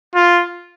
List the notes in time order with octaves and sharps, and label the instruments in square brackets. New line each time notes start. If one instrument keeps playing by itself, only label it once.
[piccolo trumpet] F4